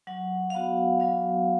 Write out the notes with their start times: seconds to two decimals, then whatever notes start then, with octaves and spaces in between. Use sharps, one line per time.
0.07 F#3 F#5
0.50 F5
0.54 B3 F#4 F#5
1.00 F#3 F5